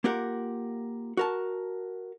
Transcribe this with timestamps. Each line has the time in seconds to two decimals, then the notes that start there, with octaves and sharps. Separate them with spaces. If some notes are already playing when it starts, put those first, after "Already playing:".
0.04 A#3 F4 G4 A#4 F#5
1.17 F#4 A#4 A5